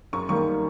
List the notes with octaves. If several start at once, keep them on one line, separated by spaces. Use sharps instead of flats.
F#2 C#6
D#3 G3 A#3 C#6